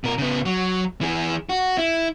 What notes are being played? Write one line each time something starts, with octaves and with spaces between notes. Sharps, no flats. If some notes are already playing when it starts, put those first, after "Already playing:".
B2 A#4
C#3 B3
F#3
E3 G#4
F#4
E4